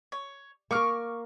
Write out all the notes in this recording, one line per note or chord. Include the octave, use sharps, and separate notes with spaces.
C#5
A#3 A#4 C#6 D6 F6